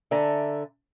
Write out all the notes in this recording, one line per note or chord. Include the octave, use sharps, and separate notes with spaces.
D3 A4 D5 E5 G#5 A#5